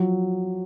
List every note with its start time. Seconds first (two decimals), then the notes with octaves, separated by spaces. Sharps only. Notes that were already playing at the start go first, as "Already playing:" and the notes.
Already playing: F3 F#3